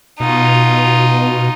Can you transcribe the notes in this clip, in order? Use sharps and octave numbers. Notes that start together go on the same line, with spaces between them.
B2 D#4 F4